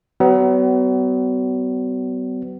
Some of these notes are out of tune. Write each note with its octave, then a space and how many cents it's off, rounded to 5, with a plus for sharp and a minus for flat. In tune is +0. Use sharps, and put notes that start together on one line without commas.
F#3 +40 B3 +30